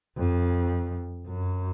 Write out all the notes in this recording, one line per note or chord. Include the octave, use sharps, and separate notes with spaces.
F2
F#2